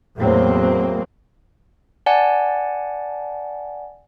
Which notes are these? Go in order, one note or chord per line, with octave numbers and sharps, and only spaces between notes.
E2 A2 F#3 A#3 C4
D5 F#5 G#5 A5